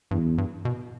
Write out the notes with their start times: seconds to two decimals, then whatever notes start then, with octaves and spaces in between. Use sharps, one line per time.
0.11 E2 G2
0.38 G2
0.65 B2